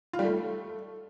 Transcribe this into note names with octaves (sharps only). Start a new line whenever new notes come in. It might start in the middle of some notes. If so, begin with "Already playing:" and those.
F4
G3
A3